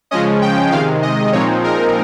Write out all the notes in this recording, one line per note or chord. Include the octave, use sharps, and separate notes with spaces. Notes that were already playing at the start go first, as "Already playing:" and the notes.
C#3 F3 G#3 C#4 D#5
G5
C3 D#3 G#3 F5
D#5
A#2 F3 G#3 C4 D#4 C#5
A#4